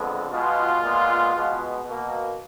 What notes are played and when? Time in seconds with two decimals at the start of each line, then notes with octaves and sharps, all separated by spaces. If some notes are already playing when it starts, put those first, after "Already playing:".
Already playing: F2 D3 G#3 B3
0.30 B2 G#3 B3 F4
0.82 A#2 G#3 B3
1.34 B2 G#3 B3
1.85 B2 A#3